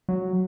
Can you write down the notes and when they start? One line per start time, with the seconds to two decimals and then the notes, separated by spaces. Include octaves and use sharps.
0.09 F#3